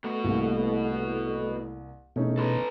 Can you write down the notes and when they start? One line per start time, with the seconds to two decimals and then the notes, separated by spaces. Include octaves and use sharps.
0.04 B2 A3 F#4
0.24 C2 A2 A#3
2.16 E2 B2 A3 C#4 D#4
2.38 A4 B4